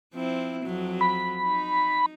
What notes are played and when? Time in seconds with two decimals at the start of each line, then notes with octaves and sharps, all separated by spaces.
0.14 F3 C4 E4
0.62 F2 F#3
1.01 B5
1.44 D#4